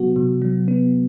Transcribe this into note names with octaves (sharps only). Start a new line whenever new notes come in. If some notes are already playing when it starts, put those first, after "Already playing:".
Already playing: C3 F#3 B3 F#4
C3
F#3
B3